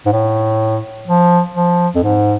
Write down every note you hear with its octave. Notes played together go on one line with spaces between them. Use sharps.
G#2
A2
F3
F3
F2
G#2